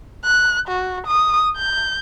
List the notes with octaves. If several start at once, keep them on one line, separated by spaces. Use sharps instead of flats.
F#6
F#4
D#6
G6